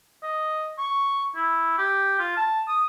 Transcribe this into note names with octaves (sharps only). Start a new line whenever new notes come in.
D#5
C#6
E4
G4
F4
A5
D#6